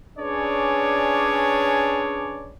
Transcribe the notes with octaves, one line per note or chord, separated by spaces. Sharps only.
C#4 D4 G#4 B4 C#5 D5